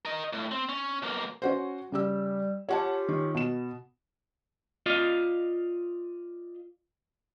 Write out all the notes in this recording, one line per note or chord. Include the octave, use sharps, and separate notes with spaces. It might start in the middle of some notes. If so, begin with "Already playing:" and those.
A#4 D#5
A2
C4
C#4
B1 A#3
C#4 F#4 C5
C#3 G3 G4 E6
C#4 F4 G4 C#5 F#5 A5
D#3
B2 E7
F4 D5 D#5 F5